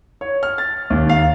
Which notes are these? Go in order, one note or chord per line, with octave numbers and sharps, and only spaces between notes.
C#5
F6
A6
D#2
F5